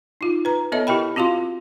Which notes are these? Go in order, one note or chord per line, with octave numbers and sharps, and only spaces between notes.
D#4 F4
B4 A#5
B3 A4 C#5 D#5 E5 A5
E4 G4 A#4 G5 B5
C4 F4 F#4 F5 C6